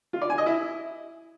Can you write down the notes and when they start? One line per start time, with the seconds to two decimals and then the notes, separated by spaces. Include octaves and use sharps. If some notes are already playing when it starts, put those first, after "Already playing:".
0.13 F4
0.22 D5
0.30 G#5
0.38 D#5
0.46 E4